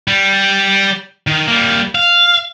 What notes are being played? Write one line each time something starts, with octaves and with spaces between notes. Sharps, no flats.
G3
D#3
G3 A#3
F5